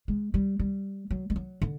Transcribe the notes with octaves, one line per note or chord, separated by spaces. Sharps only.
G#3
G3
G3
F#3
G3
F#3
D3